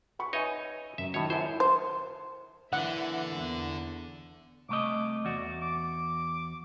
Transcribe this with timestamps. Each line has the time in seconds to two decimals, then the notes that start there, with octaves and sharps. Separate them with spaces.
0.19 F#5 B5 C#6
0.33 D#4 B4 C#5 D#5 E5 G#5
0.98 F#2 E5
1.14 A2 D#3 F#3 C#5
1.30 F#2 E4 C5 A5
1.60 C5
2.73 D3 E3 A#3 E5 F#5
3.35 E2
4.69 C2 A3 D#5 D6
5.25 E2 F#4 D5
5.62 D6